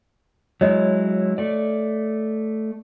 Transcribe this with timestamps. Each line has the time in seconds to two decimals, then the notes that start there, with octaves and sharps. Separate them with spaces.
0.61 F#3 G#3 E4 C#5 D#5
1.38 A3 D5